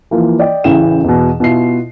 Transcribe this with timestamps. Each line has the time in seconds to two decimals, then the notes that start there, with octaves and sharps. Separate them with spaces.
0.11 E3 F3 A#3
0.39 D5 D#5 G5
0.64 A1 C#3 E3 G5 E7
1.04 E2 B2
1.40 B2 E4 F4 C7